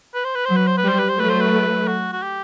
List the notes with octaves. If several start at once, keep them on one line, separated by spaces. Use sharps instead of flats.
B4
C5
B4
F#3 C5
B4
C5
B4
G3 C5
B4
C5
F#3 A3 B4
C5
B4
F#4
F#4
G4